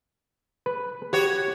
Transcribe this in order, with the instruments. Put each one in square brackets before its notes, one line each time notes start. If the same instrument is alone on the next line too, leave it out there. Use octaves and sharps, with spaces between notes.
[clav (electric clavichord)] B4
[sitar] F#4 C#5 [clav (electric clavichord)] G4